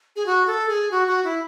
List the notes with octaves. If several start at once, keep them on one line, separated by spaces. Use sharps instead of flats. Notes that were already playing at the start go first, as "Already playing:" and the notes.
G#4
F#4
A4
G#4
F#4
F#4
E4